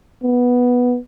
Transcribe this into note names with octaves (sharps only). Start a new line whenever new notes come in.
B3